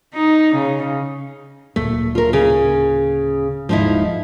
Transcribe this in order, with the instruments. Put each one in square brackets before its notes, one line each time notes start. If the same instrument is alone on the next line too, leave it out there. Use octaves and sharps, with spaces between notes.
[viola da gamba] D#4
C#3
[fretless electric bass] D1 A#2 [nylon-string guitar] A3
[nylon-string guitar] F4 A#4
C#3 G#4
[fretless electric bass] D#1 G#2 [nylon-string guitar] F3 D#4 E4